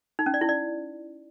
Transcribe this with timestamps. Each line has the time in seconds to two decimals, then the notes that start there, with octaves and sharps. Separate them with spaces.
0.19 D#4
0.26 C#4
0.34 D5
0.41 E4
0.49 D5